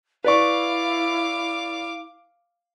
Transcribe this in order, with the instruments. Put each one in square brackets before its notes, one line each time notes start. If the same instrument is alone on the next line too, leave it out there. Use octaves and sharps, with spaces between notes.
[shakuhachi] E4 [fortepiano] B4 D5 C#6 [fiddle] F5 D6